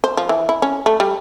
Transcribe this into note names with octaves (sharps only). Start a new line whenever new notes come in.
C5
F3
E3
E4
C#4
A3
G3